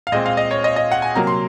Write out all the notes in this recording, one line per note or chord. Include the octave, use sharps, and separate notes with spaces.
F5
A#2 G#3 C4 D#5
F5
D#5
C#5
D#5
D#5
F#5
G#5
C3 F#3 A#3 A#5
C6